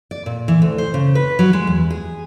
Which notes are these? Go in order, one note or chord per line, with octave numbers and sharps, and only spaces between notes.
D5
A#2
E3
D2
C5
C#3
B4
F#3
G#3
E2
G#4